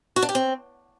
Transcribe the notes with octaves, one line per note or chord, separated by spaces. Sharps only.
F#4
D4
G4
C4